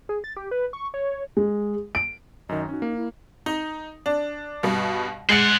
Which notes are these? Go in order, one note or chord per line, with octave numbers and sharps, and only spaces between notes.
G#4
A6
G4
B4
C#6
C#5
G#3
D7
F#2 D#3 D#5
C#4 D#4 F#4
A#3
E4
D#4
D4
G2 B2
G#3 C5 F#5 A6 C#7